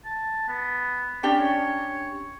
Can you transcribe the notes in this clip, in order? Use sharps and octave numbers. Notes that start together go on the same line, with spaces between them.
A5
B3
C#4 D4 G4 D5
C#5